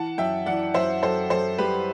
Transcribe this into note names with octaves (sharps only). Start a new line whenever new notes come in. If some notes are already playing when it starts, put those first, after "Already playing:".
Already playing: E3 F#5 A5
F#2 E5 G5
E3 D5 F#5
F#2 C5 E5
F#2 A4 C5
F#2 A4 C5
G3 G4 B4